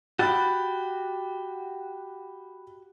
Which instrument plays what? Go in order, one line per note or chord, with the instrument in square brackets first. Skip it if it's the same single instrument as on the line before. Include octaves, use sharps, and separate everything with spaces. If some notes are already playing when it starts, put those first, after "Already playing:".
[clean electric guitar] F#4 G4 [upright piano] B5 F#6 A6